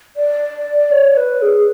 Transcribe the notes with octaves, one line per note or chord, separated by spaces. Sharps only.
D5
C#5
B4
G#4